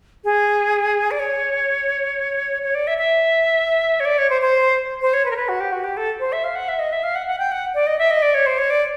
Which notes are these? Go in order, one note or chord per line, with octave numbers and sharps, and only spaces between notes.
G#4
D5
C#5
C#5
D5
E5
E5
C#5
D5
C#5
C5
C5
C5
C#5
B4
A#4
B4
F#4
G4
F#4
G4
A4
C5
E5
F5
F#5
E5
D#5
E5
F5
F#5
F#5
G5
F#5
D5
D#5
E5
D#5
D5
C#5
C5
C#5
D5